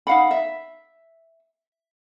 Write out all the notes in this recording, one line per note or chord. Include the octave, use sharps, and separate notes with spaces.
D#4 F5 F#5 B5
E5